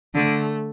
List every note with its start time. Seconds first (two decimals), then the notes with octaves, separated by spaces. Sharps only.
0.14 D3 A3